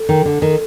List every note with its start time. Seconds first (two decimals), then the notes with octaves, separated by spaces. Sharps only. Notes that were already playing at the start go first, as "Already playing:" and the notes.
Already playing: A4
0.09 D#3
0.25 D3
0.42 D#3